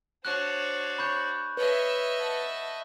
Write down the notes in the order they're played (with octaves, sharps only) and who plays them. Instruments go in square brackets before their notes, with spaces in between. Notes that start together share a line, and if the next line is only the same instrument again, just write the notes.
[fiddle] D4 F#4 [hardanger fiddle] C5 C#5 [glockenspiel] F#6
[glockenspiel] B5 C#6 G6
[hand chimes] B4 [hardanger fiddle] C#5 [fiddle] D#5 E5
[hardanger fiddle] F#5 A5